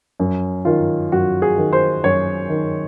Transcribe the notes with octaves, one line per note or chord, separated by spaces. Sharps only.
F#2
D#3 F4
F#2 F#4
G#4
D#3
C5
F#2 C#5
D#3